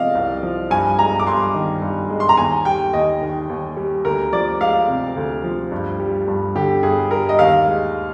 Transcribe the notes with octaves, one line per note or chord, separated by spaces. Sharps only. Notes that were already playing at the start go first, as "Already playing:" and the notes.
Already playing: C3 F3 G#3 D5 D#5 F5
C2
F3
G2 G#5
G#3 A#5
D6
G2 C6
D#3
G2
G#3
C6
A#5
D#2 G#5
G3 G5
D#2 D#5
D#3
D#2
G3
D2 A#4
F3 D5
G#3 F5
C3
D2
F3
G2
G3
G2
D3 G4
G2 G#4
G3 A#4
D#5
D#2 F5
G#3